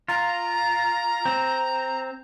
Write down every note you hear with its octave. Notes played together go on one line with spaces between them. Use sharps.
F4 A#5
C4